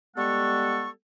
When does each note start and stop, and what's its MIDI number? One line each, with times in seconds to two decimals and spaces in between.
0.17 0.89 55
0.17 0.89 56
0.17 0.89 59
0.17 0.89 69
0.17 0.89 78
0.17 0.89 85